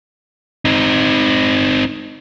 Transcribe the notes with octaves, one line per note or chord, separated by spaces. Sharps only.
C4 D#4